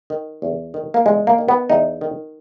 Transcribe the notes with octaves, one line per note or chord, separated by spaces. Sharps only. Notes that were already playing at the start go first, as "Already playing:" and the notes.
D#3
E2
D#3
A#3
E2 G#3
A#3
D#3
B3
E2 D#4
D#3